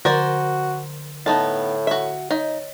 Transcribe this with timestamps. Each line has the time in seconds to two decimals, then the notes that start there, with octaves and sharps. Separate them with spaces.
0.05 D3 F#4 A#4 C5 D5
1.26 A2 B3 D#4 A5
1.87 F#4 E5
2.31 D#4 C#5 D#5